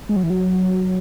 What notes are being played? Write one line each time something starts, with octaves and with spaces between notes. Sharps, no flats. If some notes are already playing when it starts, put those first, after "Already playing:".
G#3
F#3
E3
F#3